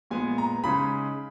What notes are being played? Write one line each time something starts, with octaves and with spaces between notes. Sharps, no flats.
A#2 G#3 B3 G#5
A#5
C#3 G#3 D#4 B5